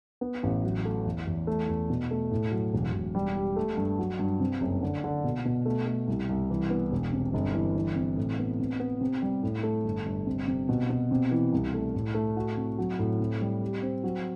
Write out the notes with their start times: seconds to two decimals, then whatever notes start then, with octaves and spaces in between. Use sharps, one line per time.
0.21 B3
0.43 A1
0.63 F#3
0.85 A3
1.06 E2
1.27 E2
1.47 A3
1.69 E2
1.90 B2
2.11 A3
2.31 A2
2.52 F#3
2.74 E1
2.93 E1
3.15 G3
3.36 G4
3.56 A3
3.77 G2
3.99 F#3
4.19 G2
4.40 C3
4.61 F#1
4.83 D3
5.04 D3
5.24 B2
5.45 B2
5.66 A3
5.87 A3
6.08 C2
6.29 C2
6.50 E3
6.70 B3
6.92 E1
7.13 C3
7.34 G1
7.54 E3
7.76 E3
7.96 C3
8.17 A2
8.39 B3
8.59 C3
8.80 B3
9.01 C3
9.22 G3
9.43 A2
9.63 A3
9.85 G1
10.06 G1
10.27 C3
10.48 C3
10.69 B2
10.90 B2
11.11 C3
11.31 E3
11.53 C2
11.74 A3
11.95 A2
12.15 A3
12.37 F#4
12.57 C3
12.78 F#3
12.99 A2
13.20 C3
13.41 G3
13.62 G4
13.82 C4
14.04 F#3